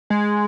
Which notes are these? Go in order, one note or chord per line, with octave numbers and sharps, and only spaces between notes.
G#3